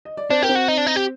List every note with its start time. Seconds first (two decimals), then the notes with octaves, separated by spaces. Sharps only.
0.05 D#5
0.17 D5
0.30 C4 D4 C5
0.43 G4 A#4
0.49 C4 C5
0.55 F#4
0.68 D#4
0.77 D4
0.87 D#4
0.96 G4